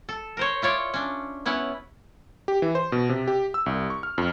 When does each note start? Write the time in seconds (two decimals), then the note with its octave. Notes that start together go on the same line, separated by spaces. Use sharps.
0.09 A4
0.37 A#4 C5 C#5
0.62 E4 F4 C#5 D5
0.94 C#4 D4
1.46 B3 C#4 E4 F#5
2.48 G4
2.62 E3
2.75 C5
2.92 B2
3.09 C3
3.28 G4
3.54 E6
3.66 C2
3.90 C#6
4.03 F6
4.18 F2